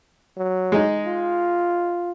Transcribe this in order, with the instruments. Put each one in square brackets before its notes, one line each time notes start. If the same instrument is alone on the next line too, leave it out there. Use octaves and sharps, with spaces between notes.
[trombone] F#3
[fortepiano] G#3 D#4
[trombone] F4